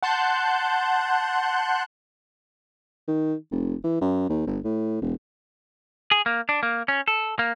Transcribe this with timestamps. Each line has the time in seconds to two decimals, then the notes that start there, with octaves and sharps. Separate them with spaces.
0.03 F#5 A5 C6 F#6 G6
3.08 D#3
3.52 F1
3.84 E3
4.01 F#2
4.30 D#2
4.47 G1
4.64 A2
5.02 E1
6.11 G#4
6.26 A#3
6.49 D4
6.63 A#3
6.88 C#4
7.08 A4
7.39 A#3